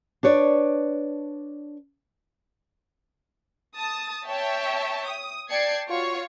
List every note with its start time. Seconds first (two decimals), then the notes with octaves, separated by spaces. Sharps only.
0.23 D4 B4 C#5 D5
3.76 A5 D#6 A6
4.26 C#5 E5 G5 A5
5.07 D#6
5.49 D5 G5 A5 G#6 C7 C#7
5.87 F4 F#4 C#5 C#6